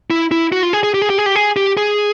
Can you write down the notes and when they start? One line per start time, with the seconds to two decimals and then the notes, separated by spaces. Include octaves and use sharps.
0.10 E4
0.31 E4
0.52 F#4
0.63 F4
0.73 G#4
0.83 G#4
0.94 G4
1.02 G#4
1.10 G4
1.18 G#4
1.26 G4
1.36 G#4
1.56 G4
1.77 G#4